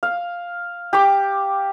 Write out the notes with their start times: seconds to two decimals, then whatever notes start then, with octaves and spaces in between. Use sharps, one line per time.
0.03 F5
0.93 G4 D6